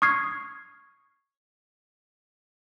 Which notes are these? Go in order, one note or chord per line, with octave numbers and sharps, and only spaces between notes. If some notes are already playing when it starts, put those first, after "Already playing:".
C#6 D#6 F6 G#6 C7